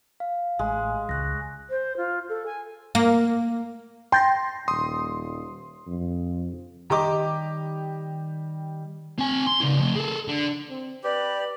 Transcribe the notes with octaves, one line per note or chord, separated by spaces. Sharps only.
F5
A1 G#3
C#2 C#6 F#6 A#6
C5
F4
A4
G#5
A#3
G5 C6 A6 A#6
D#1 C6 D#6
F2
D#3 G3 G4 D#5 A#5 D6
C4 G#5
C6
C#3 D#4
F3 A3
G#4 A4
D3
C4
G4 B4 D5